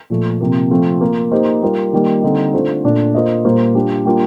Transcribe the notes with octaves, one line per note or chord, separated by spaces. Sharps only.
A#2 F3 A3
C3 F3 A#3
F3 A3 C4 F4
A#3 F4 A#4
A#3 D#4 G4 C5
G3 A#3 F4 A#4
D#3 G3 A#3
D3 G3 C4 D#4
D3 A3 D4 F4 C5
A#2 A3 D4 A4 D5
A#3 F4 C5 D#5
A#2 G3 A#3 F4 C5
G3 D4 F4
G3 A#3 D4 F4